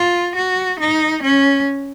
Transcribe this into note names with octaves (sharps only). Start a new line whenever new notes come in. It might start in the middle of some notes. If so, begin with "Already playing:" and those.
Already playing: F4
F#4
D#4
C#4